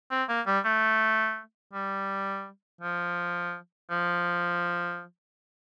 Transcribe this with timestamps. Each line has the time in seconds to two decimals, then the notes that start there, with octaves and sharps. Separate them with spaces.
0.11 C4
0.29 A#3
0.47 G3
0.65 A3
1.73 G3
2.81 F3
3.90 F3